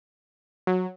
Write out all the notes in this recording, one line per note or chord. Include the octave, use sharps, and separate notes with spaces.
F#3